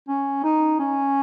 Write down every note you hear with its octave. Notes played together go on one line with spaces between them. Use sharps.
C#4
D#4
C#4